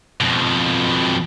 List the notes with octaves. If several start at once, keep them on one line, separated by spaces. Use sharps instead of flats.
F2 B2